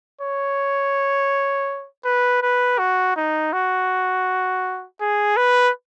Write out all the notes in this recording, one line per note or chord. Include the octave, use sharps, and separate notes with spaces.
C#5
B4
B4
F#4
D#4
F#4
G#4
B4